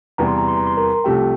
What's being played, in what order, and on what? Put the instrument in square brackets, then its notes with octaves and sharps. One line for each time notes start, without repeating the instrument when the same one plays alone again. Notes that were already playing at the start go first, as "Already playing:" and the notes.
[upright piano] E2 C3 E3 G3 [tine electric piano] A#5
[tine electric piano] C6
A#5
C6
A#5
C6
A#4 A#5
[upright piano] C2 C3 F3 A3 [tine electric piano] G4 G5